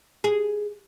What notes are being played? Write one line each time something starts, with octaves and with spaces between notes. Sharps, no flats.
G#4